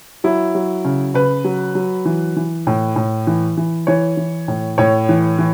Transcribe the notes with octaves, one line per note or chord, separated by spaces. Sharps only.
F#3 E4
F#3
C#3
C#3 B4
F#3
F#3
E3
E3
A2
A2
E3
E3
E3 C#5
E3
A2
A2 C#5
E3
E3